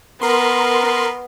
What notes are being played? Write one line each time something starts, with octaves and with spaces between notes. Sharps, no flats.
B3 A#4 C6